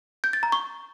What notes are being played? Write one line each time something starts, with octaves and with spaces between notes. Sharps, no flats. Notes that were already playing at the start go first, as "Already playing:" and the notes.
G6
A6
A#5
C#6